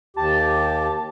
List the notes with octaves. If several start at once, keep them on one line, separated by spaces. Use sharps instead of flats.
D#2 G4 A5